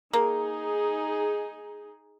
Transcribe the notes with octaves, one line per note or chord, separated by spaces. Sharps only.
A#3 D#4 G#4